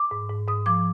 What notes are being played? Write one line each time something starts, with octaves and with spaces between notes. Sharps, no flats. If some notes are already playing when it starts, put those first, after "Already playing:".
Already playing: D6
G#2
G#2
G#2 D#6
F3 D6